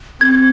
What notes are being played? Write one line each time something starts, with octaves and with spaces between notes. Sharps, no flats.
C4 G#6